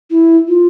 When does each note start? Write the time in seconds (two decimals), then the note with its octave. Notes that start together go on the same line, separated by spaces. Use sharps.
0.11 E4
0.48 F4